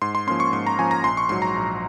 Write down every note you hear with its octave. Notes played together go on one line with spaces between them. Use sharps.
G#2 C6
C6
F3 A#3 C#4 C6
C#6
G#2 C6
A#5
F3 A#3 C#4 G#5
A#5
A#1 C6
C#6
G#2 F#3 C6
A#5
A#1